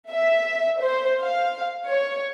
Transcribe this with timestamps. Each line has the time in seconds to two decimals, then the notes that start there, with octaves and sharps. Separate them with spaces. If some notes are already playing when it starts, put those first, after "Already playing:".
0.10 E5
0.81 C5
1.21 F5
1.87 C#5